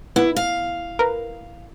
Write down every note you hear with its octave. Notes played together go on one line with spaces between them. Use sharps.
B3 E4
F5
A#4 B4